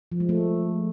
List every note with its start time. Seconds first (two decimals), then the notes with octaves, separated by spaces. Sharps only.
0.12 F3
0.20 G#3
0.29 A3